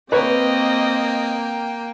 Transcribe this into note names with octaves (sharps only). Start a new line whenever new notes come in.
A#3 C4 B4 C#5 D#5 G5